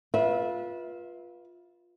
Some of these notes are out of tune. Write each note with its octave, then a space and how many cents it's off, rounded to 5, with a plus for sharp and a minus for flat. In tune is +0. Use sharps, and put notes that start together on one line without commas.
F4 +10 B4 -25 E5 -20